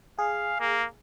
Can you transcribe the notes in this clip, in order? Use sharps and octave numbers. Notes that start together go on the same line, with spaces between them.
G#4 F5
A#3